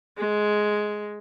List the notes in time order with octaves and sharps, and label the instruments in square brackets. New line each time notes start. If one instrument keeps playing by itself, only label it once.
[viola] G#3